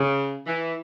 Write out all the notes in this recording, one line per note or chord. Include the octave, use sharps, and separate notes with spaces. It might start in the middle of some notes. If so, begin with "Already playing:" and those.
Already playing: C#3
E3